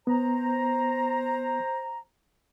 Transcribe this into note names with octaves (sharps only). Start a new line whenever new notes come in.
B3 C5 A#5